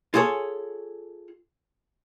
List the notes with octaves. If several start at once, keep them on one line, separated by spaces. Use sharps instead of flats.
F4 G#4 A4 C#5